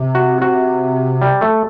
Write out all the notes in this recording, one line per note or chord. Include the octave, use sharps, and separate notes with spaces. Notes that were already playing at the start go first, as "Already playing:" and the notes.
Already playing: C3
F#4
F#4
G3
A3